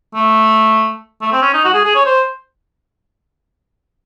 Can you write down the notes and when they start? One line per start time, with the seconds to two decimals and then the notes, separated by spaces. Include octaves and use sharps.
0.15 A3
1.21 A3
1.32 C4
1.42 C#4
1.54 D#4
1.64 F#4
1.74 G#4
1.85 G#4
1.95 C#5
2.06 C5